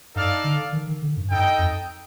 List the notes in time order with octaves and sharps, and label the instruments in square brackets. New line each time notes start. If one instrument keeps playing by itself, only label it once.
[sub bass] G2 [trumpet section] D#4 A4 D5 F5
[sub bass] D3
D#3
D#3
D3
G2
[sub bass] G2 [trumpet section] D#4 A4 D#5 G5
[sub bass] F2